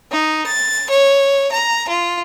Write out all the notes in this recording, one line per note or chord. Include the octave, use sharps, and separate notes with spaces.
D#4
A6
C#5
A#5
F4